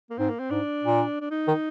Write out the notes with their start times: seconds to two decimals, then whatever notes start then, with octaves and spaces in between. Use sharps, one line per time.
0.10 A#3
0.18 G#2 C4
0.30 A#3
0.40 C4
0.51 G#2 D4
0.83 A#2
1.21 D4
1.31 D#4
1.47 D#3